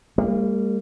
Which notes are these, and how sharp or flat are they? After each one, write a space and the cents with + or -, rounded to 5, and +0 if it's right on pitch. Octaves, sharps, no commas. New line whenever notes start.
G3 +40 A#3 -30